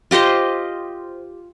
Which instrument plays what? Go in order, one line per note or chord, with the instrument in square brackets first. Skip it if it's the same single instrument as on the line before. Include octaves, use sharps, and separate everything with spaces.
[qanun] F4 G4 C5 D#5